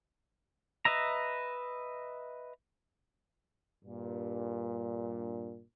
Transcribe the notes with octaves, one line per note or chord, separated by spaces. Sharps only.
B4 D#5 E5 A#5
G2 A#2